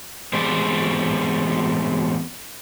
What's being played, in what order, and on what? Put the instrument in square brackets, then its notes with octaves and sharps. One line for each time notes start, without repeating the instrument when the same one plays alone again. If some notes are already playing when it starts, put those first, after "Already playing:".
[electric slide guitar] E2 G#3 C4 G4 D5